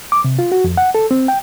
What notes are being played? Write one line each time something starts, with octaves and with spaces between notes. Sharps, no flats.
D6
C3
F4
F#4
F2
F#5
A4
C4
G5